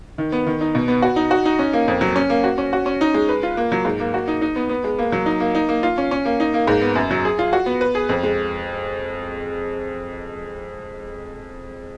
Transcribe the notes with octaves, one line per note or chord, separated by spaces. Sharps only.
D#3
B3
D#3
D#4
B2
B3
F#4
D#4
F#4
D#4
C#4
A#3
F2
F#3
C#4
A#3
F#4
C#4
F#4
C#4
D#4
G#3
B4
F4
A#3
F#3
G#2
A#3
F#4
D#4
D#4
B3
B3
G#3
A#3
F#3
D#4
A#3
D#4
A#3
F4
C#4
C#4
A#3
D#4
A#3
G#2
B3
F#2
F#3
G#4
F4
F#4
B3
B4
G#4
F2
G#3